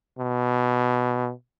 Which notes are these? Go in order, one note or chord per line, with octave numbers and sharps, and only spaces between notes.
B2